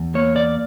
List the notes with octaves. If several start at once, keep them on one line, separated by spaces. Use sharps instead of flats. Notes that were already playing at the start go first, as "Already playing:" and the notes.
Already playing: E2
A#3 C#5
D5